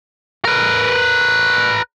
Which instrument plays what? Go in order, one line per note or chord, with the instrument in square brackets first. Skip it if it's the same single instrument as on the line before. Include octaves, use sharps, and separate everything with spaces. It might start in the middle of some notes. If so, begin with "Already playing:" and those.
[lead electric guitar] A#4 B4